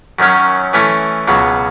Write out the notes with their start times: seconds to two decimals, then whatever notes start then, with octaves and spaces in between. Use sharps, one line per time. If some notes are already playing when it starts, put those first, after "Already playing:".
0.19 F#2 D#3 F#3 C#4
0.73 E3 A3 C#4
1.28 C#2 B2 F#3